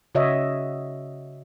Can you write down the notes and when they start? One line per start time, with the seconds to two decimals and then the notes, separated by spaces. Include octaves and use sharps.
0.15 C#3 F#4 C#5 D#5 E5